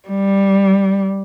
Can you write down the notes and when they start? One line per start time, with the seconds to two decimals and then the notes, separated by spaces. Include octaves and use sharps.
0.09 G3